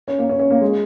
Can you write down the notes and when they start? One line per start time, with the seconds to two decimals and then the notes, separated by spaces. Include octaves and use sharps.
0.08 C#4
0.19 A#3
0.29 C#4
0.40 C#4
0.51 A#3
0.61 G#3